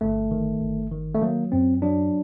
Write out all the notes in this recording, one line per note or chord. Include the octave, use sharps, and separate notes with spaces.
G1 A3
D#3
G1
D#3
A3
F#3 A#3
F#2 C4
F#3 D4